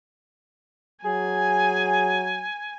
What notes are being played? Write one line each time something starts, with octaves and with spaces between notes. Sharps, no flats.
F#3 G#4 G#5